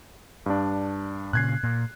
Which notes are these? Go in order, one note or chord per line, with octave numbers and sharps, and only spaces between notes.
G2 D4
A#2 C#3 F#6 G#6 C7
A#2